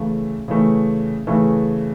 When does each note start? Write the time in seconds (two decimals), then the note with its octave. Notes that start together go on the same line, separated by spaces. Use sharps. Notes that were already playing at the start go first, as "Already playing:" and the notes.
Already playing: C#3 E3 A3
0.48 C#3 E3 A3
1.27 C#3 E3 A3